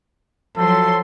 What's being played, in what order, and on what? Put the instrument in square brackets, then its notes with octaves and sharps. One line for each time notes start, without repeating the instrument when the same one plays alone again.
[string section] F3 F#3 C6 [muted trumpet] A4